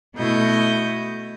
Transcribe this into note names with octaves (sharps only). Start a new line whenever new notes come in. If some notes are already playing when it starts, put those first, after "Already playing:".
B2 A3 E4 D#5 G6